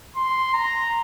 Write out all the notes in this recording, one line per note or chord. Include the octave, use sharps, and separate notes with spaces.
C6
A#5